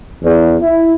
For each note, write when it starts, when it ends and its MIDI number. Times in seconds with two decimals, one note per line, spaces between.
0.23 0.56 40
0.61 0.93 64